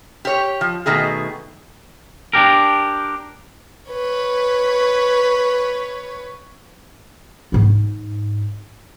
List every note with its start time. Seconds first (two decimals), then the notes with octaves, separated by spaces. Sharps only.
0.25 G4 C#5
0.61 F3
0.86 B2 D#3 A3 G#4
2.33 D4 G4 A#4
3.91 B4 C#5
7.52 G#2 D#4